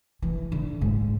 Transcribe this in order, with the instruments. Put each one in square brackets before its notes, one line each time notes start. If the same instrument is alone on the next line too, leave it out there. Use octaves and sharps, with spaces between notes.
[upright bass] E3
D3
G#2